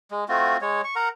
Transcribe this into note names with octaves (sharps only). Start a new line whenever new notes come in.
G#3
A3 C4 F4 F#4
G#3 C#5
C#6
A#4 F#5 A#5